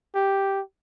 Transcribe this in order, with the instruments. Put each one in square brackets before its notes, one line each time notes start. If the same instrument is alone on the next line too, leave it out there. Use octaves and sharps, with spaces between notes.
[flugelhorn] G4